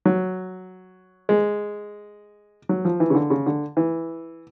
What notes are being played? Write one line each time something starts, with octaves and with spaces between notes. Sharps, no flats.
F#3
G#3
F#3
F3
E3
C#3
D3
C#3
D3
E3